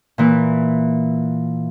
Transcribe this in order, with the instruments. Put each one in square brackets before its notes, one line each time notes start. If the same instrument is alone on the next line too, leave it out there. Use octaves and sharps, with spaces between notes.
[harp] A#2 E3